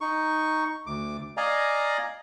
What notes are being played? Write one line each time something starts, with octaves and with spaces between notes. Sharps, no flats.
D#4 C#6
D2 D6
D5 D#5 F5 G#5 A#5